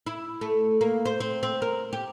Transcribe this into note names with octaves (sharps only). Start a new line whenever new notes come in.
E4
A3
A#3
C5
C4
C4
A#4
G4